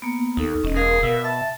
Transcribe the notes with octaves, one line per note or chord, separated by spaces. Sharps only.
A#3 B3
D#2 D#4 A4
E1 C#4 D#5
G#4 A#4 F5
B2 E5
E5 A5